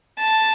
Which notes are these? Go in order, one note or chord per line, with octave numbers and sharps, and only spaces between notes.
A5